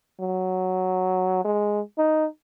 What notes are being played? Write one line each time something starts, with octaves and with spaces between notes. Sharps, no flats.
F#3
G#3
D#4